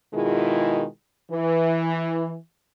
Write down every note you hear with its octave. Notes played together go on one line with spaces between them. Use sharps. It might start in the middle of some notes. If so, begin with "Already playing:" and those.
B2 D#3 G#3 E4 F4 G#4
E3